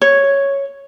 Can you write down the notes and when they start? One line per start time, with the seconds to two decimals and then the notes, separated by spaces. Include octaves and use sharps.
0.01 C#5